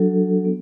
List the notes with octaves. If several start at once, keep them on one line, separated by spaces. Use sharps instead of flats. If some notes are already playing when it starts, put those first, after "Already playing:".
Already playing: F#3 D4 F#4 A4
B3